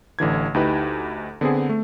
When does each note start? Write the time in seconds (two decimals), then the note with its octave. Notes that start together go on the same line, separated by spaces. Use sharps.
0.19 A1 D3 E3 G#6
0.54 D2 D#4 E4 G4 B4
1.41 D3 B3 C4 G#4
1.69 A3